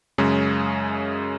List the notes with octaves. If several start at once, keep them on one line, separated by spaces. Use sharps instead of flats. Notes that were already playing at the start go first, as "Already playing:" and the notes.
F#2 C#3 G#3 C#4